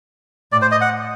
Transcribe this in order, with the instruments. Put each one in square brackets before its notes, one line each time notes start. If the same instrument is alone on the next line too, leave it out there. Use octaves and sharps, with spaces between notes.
[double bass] A2 [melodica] D5
[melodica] C5
D#5
F#5